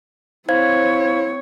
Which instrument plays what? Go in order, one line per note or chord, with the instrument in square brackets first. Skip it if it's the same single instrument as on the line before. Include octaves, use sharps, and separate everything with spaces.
[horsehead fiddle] C4 C#5 [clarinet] E4 [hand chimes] C5 F5 G#6